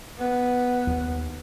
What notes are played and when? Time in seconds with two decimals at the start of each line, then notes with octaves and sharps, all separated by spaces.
0.18 B3
0.87 D#2